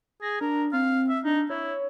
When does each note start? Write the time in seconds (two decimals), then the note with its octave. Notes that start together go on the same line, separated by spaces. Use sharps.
0.22 G#4 A#6
0.41 D4 A#4
0.73 C4 F5
1.10 E5
1.25 D4 D#4
1.50 E4 C#5